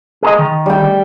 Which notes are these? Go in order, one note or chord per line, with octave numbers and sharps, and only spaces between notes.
G#4 A4 D#5
D#3
G3 G5